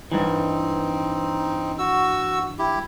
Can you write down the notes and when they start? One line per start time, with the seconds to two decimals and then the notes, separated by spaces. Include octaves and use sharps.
0.12 G2 E3 C4 D#4
1.79 F#4 E6
2.59 E4 G4